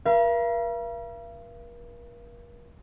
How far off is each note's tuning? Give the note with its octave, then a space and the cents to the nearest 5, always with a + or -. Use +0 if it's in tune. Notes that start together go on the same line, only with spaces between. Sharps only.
A#4 +45 F5 -45